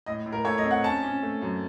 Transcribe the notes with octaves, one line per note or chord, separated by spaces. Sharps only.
A2 D#5
A2
A#4
A3 C#5
D#5
C4
F#5
C#4 A5
C#4
A3
F#2